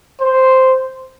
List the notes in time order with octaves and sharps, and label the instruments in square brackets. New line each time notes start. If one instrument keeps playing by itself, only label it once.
[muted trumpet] C5